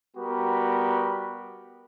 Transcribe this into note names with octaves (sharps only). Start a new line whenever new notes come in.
G3 B3 F#4 G4 A#4 B5